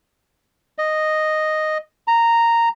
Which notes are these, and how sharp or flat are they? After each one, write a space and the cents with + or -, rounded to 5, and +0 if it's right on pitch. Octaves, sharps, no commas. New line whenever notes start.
D#5 -5
A#5 -10